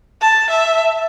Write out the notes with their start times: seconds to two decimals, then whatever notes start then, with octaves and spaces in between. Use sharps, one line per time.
0.21 A5
0.50 E5